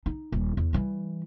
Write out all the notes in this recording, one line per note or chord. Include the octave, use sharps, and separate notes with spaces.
D#4
D#1
E2
E3 G3